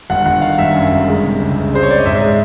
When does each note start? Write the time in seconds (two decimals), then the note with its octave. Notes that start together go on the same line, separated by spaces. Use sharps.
0.10 G1 F#5
0.26 G1 F#5
0.41 D#3 F5
0.58 G1 E5
0.74 F#2
0.92 G1
1.07 G#3
1.24 C3
1.40 C#2
1.56 C#2
1.73 G#3 C5
1.83 C#5
1.89 G#3 D5
1.98 D#5
2.06 G#2 E5
2.22 G#3